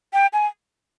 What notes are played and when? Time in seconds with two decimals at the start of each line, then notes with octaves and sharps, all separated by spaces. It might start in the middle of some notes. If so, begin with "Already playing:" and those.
0.13 G5
0.33 G#5